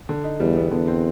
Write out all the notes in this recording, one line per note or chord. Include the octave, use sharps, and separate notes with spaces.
D3
D#4
E2 G3
B3
E2 D3
C4